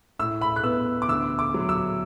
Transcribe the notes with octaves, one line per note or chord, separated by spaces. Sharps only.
A2 E6
B5
F#6
B3 E6
D6
D2 E6
D6
F#3
E6